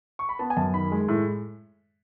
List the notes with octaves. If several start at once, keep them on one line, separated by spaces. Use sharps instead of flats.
C#6
B5
B3 A5
G#5
F#2 A5
D#3 B5
G#3
A2